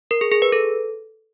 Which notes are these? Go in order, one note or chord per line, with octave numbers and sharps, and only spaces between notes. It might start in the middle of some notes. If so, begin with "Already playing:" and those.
A#4
G#4
G#4
B4
A4